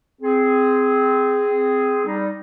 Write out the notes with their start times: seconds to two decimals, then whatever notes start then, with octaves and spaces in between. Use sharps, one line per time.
0.21 C4 G#4
2.06 G3 D#4